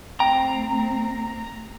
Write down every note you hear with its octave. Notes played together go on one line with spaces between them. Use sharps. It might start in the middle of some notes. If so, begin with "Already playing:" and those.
A3 C4 G5 A#5